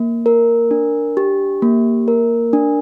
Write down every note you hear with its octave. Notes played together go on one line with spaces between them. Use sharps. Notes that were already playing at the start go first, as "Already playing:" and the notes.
Already playing: A#3
A#4
D4
G4
A#3
A#4
D4